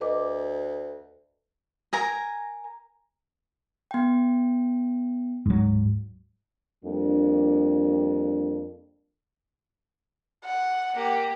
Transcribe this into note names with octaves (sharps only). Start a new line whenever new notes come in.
D2 B4 D#5 D6
A#4 G#5 A#5
B3 G5
D1 G#2 F#3
F2 G3 A#3 D4
F#5
A#3 G4